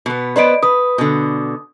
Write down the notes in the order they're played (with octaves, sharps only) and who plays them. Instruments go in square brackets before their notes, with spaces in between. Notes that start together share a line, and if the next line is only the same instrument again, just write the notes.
[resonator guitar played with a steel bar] B2 B3
[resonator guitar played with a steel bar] B3 B4 C5 [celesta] D5 D#5 D7
[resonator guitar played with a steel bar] B4 [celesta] D#6
[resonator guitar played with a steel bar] B2 D3